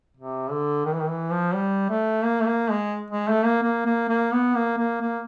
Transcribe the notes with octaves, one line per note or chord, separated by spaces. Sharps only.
C3
D3
D#3
E3
D#3
E3
F3
G3
A3
A#3
A3
A#3
G#3
G#3
A3
A#3
A#3
A#3
A#3
B3
A#3
A#3
A#3